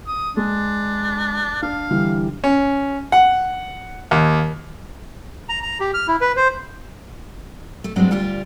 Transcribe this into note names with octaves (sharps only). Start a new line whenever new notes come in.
D#6
G#3 D4
D4 F5
D3 E3 G3
C#4
F#5
D#2
A#5
A#5
G4
F6
E4
B4
C5
A3
G2 F#3 G#3 C4 D4
D2 G3 F4 G4